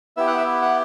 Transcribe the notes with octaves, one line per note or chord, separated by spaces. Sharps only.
B3 E4 G4 E5
F#5
E5
F#5